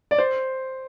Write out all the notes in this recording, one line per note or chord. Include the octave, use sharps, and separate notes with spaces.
D5
C5